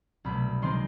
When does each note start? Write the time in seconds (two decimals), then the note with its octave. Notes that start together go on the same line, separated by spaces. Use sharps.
0.25 C2 B2 F#3 A3 B5
0.62 C3 D#3 G#3 C4 C6